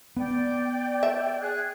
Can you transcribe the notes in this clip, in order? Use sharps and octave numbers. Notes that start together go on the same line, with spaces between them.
B3 D5 G5
E5
G#4 F#6